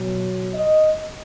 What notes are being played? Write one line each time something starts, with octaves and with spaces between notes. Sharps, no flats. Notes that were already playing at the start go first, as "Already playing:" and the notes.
Already playing: B2 F#3
D#5